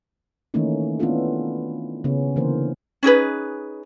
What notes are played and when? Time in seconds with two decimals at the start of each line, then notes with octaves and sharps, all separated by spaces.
0.54 D#3 E3 A3 A#3 C#4 D#4
1.00 B3 C#4 D4 E4 F4 A4
2.04 C#3 B3 C#4
2.36 D3 E3 A#3 A#4 C5
3.03 C#4 D#4 G#4 B4